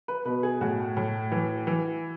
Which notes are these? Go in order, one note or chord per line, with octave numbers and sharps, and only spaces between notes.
B4
B2 B4
G#4
A2 F#4
A2
E3
E3